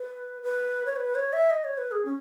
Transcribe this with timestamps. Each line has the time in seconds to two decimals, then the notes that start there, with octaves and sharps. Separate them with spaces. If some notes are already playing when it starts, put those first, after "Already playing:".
Already playing: B4
0.43 B4
0.86 C#5
0.96 B4
1.15 C#5
1.33 E5
1.50 D#5
1.64 C#5
1.78 B4
1.92 G#4
2.05 C#4